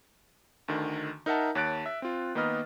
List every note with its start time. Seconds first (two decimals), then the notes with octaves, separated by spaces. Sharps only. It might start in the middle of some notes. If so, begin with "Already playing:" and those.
0.68 D2 D3 D#3
1.26 D#4 A#4 E5 F#5 A5
1.55 D#2 C#5 A5 F#6 A6 D7
1.86 E5
2.02 C4 F4
2.35 D#3 A#3 B3 B4 D#5 F6